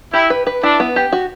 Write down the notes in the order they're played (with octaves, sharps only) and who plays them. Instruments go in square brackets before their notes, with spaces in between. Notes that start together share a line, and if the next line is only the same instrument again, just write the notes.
[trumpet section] E4 [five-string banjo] G4
[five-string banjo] B4
B4
[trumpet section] D4 [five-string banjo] E4
[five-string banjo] B3
G4
F#4